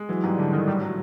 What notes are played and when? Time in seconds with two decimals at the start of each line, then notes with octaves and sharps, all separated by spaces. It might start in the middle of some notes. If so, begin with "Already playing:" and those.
Already playing: G#3
0.09 E3 F#3
0.23 G#2 G3
0.38 D3 A3
0.52 D#3 E3
0.67 A2 G3
0.81 F#3